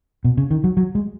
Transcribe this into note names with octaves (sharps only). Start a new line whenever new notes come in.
B2
C#3
D#3
F#3
F#3
G#3